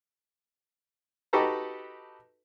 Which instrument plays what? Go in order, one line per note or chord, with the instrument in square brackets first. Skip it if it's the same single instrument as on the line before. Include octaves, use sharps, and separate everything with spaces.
[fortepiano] D#4 F#4 G4 A4 B4 A#5